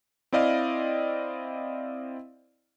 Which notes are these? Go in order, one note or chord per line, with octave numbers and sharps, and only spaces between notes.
C4 E4 D5 D#5 F5